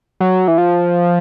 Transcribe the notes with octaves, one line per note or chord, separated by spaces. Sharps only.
F#3
E3
F3